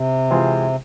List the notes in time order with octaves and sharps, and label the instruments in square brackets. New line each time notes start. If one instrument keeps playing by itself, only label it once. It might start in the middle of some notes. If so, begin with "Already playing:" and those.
Already playing: [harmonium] C3
[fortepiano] E3 G#3 C4 F4 G#4